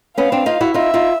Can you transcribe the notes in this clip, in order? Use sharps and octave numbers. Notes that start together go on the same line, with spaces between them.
B3 C#4 F5
C4 D4
D#4 F4
E4 F#4
D#4 F4 E5
D#4 F4